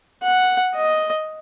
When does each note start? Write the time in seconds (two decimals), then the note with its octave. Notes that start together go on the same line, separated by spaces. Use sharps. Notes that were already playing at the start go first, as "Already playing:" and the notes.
0.23 F#5
0.75 D#5